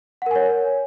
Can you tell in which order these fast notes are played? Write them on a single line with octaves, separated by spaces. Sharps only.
F#5 A#4 G#5 C#5